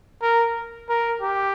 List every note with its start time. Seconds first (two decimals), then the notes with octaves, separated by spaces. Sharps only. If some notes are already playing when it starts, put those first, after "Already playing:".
0.22 A#4
0.89 A#4
1.21 G4